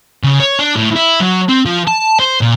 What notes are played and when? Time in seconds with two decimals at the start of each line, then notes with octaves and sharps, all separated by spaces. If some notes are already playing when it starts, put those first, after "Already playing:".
0.24 C#3
0.40 C#5
0.59 D4
0.76 A2
0.96 E4
1.21 F#3
1.49 C4
1.66 F3
1.88 A5
2.19 C5
2.41 A#2